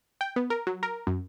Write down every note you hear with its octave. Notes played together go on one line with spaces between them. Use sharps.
G5
B3
A#4
F#3
A#4
F#2